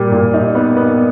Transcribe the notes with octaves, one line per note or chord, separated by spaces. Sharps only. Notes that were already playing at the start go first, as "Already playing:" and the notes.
Already playing: A#2 G3
A#2
D#4
B3
B3